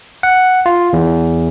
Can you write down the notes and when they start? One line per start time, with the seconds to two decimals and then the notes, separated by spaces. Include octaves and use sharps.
0.23 F#5
0.66 F4
0.93 E2